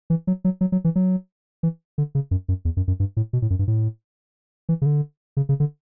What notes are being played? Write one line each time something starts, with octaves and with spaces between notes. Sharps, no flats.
E3
F#3
F#3
F#3
F#3
E3
F#3
E3
D3
C#3
F#2
F#2
E2
F#2
F#2
G2
A2
B2
A2
F#2
G2
A2
E3
C#3
D3
C#3
C#3
D3